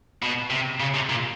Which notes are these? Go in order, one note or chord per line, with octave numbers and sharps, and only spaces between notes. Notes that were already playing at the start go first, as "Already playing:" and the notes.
B2
C3
C#3
C3
A#2